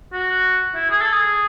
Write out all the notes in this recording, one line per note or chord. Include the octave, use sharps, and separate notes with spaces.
F#4
E4
G#4
A4
G#4